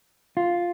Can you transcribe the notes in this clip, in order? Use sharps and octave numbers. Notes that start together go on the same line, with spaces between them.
F4